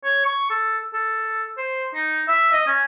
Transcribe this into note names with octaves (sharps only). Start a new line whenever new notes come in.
C#5
C#6
A4
A4
C5
D#4
E5
D#5
C#4